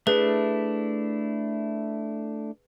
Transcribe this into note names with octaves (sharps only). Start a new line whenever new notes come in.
A3 D4 E4 G#4 B4